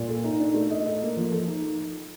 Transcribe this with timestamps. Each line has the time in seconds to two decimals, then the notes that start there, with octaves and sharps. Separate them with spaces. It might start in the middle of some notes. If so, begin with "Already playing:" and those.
Already playing: A#2
0.08 A4
0.24 D#4
0.40 D4
0.54 A3
0.70 D#5
0.86 A4
1.02 A#3
1.17 F3
1.32 A4
1.48 D#4